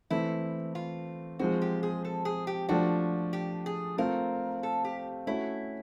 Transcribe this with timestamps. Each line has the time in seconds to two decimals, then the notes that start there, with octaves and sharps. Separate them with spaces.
0.10 E3 A3 C4 E4
0.75 F4
1.39 F3 G#3 C4 F#4
1.62 G4
1.83 G#4
2.05 A4
2.25 G#4
2.47 G4
2.69 F3 A3 D4 F#4
3.33 G4
3.66 G#4
3.98 A3 C4 F4 A#4
4.63 A4
4.85 G4
5.27 A3 C#4 E4 F#4